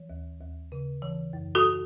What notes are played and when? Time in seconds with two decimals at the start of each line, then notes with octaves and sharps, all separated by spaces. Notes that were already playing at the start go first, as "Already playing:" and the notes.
Already playing: E3
0.10 D#2
0.40 D#2
0.72 C#3
1.02 E3
1.33 F#2
1.55 F#4 A4